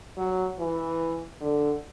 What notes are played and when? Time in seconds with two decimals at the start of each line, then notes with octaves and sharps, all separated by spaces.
0.17 F#3
0.59 E3
1.41 D3